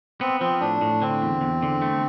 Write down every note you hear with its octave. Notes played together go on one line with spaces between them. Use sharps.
B3 C4
F3 C4
A2 D4
A2
D3 C4
E2
E2
D3
A3